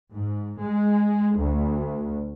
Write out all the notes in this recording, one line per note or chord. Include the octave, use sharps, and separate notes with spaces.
G#2
G#3
D2